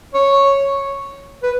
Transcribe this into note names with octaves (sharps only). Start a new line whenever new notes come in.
C#5
B4